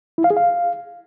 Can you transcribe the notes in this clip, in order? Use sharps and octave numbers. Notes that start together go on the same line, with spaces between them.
E4
F5
G#4
F5